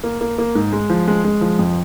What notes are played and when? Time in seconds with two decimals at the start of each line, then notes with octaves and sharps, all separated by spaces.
0.04 A#3
0.21 A#3
0.38 A#3
0.55 G#2
0.72 G#3
0.90 F3
1.07 G#3
1.24 G#3
1.41 F3
1.59 F2